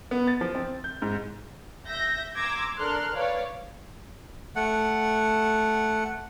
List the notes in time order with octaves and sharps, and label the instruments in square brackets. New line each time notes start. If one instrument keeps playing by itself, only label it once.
[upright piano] B3
A6
F3
C4
G6
G#2
[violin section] E5 G6 A#6
A#5 C6 D6 E6 G#6 A#6
D4 A4 A#4 C6 F6 F#6
B4 C#5 D5 F5
[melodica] A3 F#5